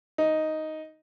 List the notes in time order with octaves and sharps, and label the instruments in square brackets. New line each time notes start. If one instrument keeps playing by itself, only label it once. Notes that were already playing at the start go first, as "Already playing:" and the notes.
[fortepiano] D#4